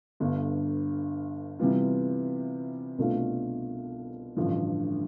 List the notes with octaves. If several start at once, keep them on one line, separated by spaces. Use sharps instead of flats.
G1 G2 D3
C3 E3 G3 B3 F4
C2 B2 A3 D4 F4
A1 G2 D3 F3